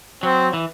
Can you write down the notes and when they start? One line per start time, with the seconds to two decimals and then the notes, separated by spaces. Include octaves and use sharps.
0.23 F#3 C4
0.53 E3